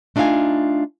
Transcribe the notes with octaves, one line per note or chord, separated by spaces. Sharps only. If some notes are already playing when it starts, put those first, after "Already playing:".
A3 D4 D#4 F4 F5 G#5